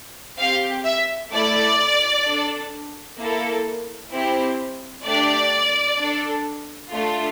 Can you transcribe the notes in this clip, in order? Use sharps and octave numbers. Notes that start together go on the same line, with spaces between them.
C4 G4 F5
E5
A3 E4 A4 D5
D4 A4
A#3 E4 A4
C4 E4 G4
A3 D4 G4 D5
D4 A4
A3 D4 F4